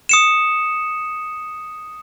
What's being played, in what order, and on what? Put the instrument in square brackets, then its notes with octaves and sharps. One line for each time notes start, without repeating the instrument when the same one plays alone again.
[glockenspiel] D#6 C#7 E7